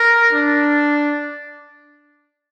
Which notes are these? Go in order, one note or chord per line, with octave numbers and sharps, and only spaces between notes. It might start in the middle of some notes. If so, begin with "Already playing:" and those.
Already playing: A#4
D4